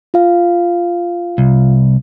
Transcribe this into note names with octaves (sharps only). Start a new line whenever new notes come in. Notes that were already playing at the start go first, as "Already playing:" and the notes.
F4 F5
C2